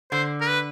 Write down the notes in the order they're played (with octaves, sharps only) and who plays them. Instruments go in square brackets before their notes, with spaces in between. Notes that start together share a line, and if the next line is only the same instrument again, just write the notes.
[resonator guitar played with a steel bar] D3 [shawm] C5
[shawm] A#4
B4